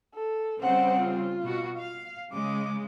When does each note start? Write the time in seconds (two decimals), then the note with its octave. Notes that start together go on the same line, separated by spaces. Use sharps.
0.15 A4
0.62 C#3 G3 C4 C5 F#5
0.99 F4
1.41 B2 F#4
1.78 F5
2.33 C#3 G#3 D6